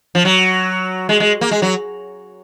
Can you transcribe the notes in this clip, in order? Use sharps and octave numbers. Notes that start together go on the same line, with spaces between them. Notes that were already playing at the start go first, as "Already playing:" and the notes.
F3
F#3
G#3
G#3
A#3
G#3
F#3